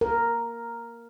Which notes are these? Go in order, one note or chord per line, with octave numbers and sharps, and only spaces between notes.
A#4